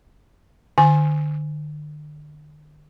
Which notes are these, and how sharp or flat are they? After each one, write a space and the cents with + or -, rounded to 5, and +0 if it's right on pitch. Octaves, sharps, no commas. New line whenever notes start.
D3 +40 G#5 +0